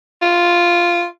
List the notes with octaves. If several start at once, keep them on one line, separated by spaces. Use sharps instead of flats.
F4